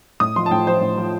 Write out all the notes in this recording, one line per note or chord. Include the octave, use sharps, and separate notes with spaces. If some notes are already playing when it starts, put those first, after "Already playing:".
A2 D#6
F3 C6
A5
A2 G5
F3 C5
A2
F3